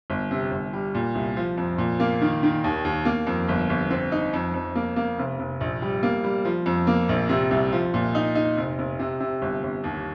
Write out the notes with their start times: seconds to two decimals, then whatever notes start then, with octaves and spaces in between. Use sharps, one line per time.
0.10 G1
0.31 C3
0.51 G1
0.73 G3
0.94 A#2
1.15 C2
1.37 F3
1.57 F2
1.78 A#2
2.00 A#3
2.21 D#3
2.43 D#3
2.64 D#2
2.85 D#2
3.05 A#3
3.27 F2
3.48 G1
3.70 G1
3.90 C4
4.12 D#4
4.33 F2
4.54 F2
4.75 A#3
4.96 A#3
5.18 F1
5.39 F1
5.61 A#1
5.82 G3
6.03 A#3
6.24 G3
6.45 F3
6.66 F2
6.87 A#3
7.09 A#1
7.29 C3
7.51 C2
7.72 F3
7.94 A#2
8.15 D#4
8.35 D#4
8.58 F1
8.79 F1
8.99 C3
9.20 C3
9.42 G1
9.63 G1
9.84 D#2